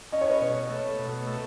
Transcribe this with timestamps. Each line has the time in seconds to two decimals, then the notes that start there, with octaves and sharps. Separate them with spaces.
0.12 C#4 D#5
0.21 C#5
0.30 B4 D#5
0.42 B2
0.70 A3
0.99 B2
1.27 A3